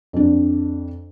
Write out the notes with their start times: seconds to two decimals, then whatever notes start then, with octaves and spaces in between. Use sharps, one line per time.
0.13 F2 D4